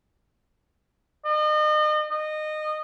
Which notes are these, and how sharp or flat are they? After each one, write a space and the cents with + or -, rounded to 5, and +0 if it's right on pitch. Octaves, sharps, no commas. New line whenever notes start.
D#5 -35
D#5 -20